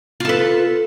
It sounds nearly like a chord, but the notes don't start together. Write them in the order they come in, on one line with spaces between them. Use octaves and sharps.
F4 A4 B4